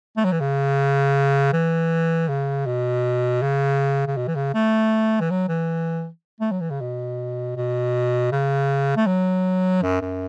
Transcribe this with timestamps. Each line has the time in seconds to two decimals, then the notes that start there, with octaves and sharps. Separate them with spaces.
0.17 A3
0.25 F#3
0.32 E3
0.40 C#3
1.53 E3
2.29 C#3
2.66 B2
3.42 C#3
4.07 C#3
4.17 B2
4.27 E3
4.35 C#3
4.54 A3
5.20 E3
5.30 F#3
5.48 E3
6.40 A3
6.51 F#3
6.61 E3
6.70 C#3
6.81 B2
7.56 B2
8.32 C#3
8.96 A3
9.07 F#3
9.82 F#2
10.01 F#2